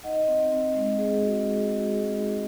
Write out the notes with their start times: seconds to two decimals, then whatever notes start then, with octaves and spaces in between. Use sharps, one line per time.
0.04 D#4 D#5 F#5
0.28 C4
0.51 C4
0.75 G#3
0.98 G#3 G#4
1.22 F#4
1.46 G#3
1.70 F#4
1.93 G#3 G#4
2.17 D#4